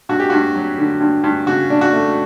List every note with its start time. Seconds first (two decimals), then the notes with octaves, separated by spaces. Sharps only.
0.09 G2 F#4
0.20 G4
0.30 G2 F#4
0.56 F#3
0.78 D3
1.00 G2
1.24 G2
1.47 C#3 F#4
1.70 D4
1.81 F#4
1.93 A3